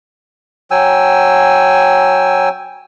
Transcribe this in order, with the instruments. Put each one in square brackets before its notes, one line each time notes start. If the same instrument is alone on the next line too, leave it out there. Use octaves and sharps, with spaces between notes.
[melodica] F#3 G5 G#5 E6